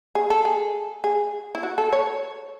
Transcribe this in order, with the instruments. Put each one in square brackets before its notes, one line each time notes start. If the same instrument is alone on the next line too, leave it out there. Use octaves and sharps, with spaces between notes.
[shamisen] G#4
A4
G#4
G#4
E4
F#4
A4
C#5